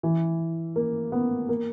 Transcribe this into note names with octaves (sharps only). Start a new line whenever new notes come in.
E3
A#3
B3
A#3